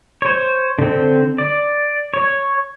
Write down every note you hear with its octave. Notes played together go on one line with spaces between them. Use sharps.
C5 C#5
D3 C4
D5
C#5